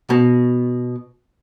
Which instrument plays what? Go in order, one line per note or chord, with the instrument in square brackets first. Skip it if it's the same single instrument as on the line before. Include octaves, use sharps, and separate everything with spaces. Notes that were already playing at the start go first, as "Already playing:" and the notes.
[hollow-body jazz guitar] B2